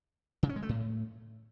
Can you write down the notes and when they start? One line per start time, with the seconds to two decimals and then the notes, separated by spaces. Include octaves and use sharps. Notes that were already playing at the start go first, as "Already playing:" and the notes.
0.43 C#3
0.49 C#4
0.56 G#3
0.62 A3
0.69 A2